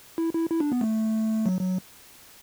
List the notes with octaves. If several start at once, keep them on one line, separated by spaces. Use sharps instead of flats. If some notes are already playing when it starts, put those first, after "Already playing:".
E4
E4
E4
D4
B3
A3
F#3
F#3